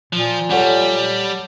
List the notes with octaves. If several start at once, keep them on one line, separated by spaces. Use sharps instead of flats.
A#2 F3
G3 A4 C#5 F#5